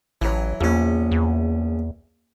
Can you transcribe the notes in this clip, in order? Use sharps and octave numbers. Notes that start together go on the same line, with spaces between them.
A1 E3 F#3
A#1 E2 C#4
E2